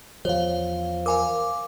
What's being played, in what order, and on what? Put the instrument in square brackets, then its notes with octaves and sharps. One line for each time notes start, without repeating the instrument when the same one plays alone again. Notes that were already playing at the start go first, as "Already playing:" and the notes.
[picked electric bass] E2 F3 [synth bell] C5 F5 [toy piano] C#5
[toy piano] A#4 B5 [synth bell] F5 G#5 D6